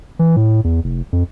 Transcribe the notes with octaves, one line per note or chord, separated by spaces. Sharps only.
E3
A2
E2
F1
F2